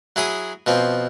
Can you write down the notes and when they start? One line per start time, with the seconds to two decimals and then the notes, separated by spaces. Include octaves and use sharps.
0.16 F#3 E4 G#4 D#6
0.67 B2 F3 C4